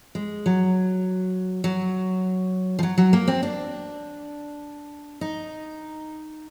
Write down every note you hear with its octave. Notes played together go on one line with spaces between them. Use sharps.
G#3
F#3
F#3
F3
F#3
F#3
A#3
C4
D4
D#4